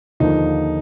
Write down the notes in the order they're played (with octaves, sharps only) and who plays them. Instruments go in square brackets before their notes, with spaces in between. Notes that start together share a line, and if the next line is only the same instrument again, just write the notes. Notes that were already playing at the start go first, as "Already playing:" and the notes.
[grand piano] D#2 D3 F3 A#3 D#4